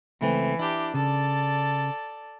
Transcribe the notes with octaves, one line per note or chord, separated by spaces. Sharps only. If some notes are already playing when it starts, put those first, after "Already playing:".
C#2 E3 A3 C4
D4 E4 G4
C#3 A4 D5